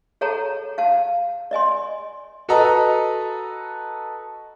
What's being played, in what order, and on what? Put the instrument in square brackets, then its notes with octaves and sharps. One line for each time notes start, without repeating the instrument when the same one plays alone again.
[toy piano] G#4 A4 C#5 F#5 A5 A#5
F5 F#5 A5
D5 D#5 G#5 C6
[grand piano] F#4 A4 B4 D#5 A#5